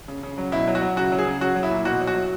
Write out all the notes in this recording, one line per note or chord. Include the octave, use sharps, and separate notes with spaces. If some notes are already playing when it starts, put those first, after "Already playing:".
C#3
C#3
F#3
B2 E4
F#3
F#4
F#3
C#3 F#4
F#3
G#4
C#3
F#3 F#4
F#3
E4
A#2
B2 F#4
F#3
F#4
F#3